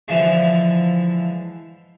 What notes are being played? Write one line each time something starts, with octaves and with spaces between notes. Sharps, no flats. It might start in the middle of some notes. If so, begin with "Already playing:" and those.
D3 E3 F3 G#3